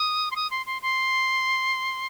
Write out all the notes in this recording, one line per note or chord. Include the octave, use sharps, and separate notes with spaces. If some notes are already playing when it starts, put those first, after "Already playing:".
Already playing: D#6
C6
D#6
C6
C6
C6